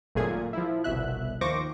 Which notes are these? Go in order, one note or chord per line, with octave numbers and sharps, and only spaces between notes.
G#1 F#2 A#2 A3 G#4 G#6
A#2
F3 E4
G1 C2 B2 E5 F#6
D#2 F3 C5 C#6 D6 A#6